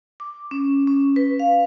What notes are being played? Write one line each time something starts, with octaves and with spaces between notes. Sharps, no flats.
D6
C#4
C#4
B4
F5